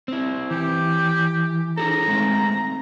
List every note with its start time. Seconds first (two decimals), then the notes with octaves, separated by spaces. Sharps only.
0.08 C4 E4
0.51 E3 G4
1.78 D#4 G#4 A4 A#5
2.08 G#3 A3 C4